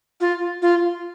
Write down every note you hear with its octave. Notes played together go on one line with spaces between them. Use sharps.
F4
F4